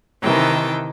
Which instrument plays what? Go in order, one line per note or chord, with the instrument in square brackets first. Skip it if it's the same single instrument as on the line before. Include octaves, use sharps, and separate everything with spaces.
[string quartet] C3 D#3 E3 G5 A5